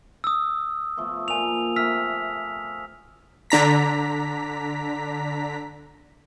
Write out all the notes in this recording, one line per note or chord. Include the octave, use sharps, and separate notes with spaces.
D#6 E6
F3 A3 B3
A#2 A#3 G#5 F7
C3 A3 E6 F6 B6
D3 D4 A#5 B6